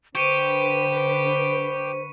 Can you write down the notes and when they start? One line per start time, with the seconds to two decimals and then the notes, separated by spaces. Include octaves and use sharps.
0.15 D3 G4 B4 C5 C#6 C#7 D#7